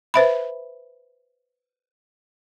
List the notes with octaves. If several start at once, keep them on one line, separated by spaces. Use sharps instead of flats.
B4 C5 E5 B5